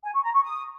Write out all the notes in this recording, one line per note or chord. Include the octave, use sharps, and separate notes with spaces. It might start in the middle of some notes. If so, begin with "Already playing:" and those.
G#5
C#6
A#5
C#6
D#6